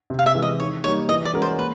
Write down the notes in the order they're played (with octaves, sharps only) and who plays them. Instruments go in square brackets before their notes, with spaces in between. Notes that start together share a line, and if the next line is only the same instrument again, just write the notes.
[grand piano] C3
[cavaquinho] F5
E5
[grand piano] E3 G#3
[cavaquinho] D#5
[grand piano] D#3 [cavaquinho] C#5
[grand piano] G3 A#3 D#4 [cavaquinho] C#5
[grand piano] E3 [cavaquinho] D#5
[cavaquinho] D5
[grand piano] G#3 C#4 F#4 A#4
[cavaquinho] C5
[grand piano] A#3 [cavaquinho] B4